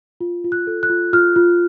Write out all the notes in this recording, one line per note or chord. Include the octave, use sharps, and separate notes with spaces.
F4
F4
F#6
A4
F#6
F4
F4 F6
F4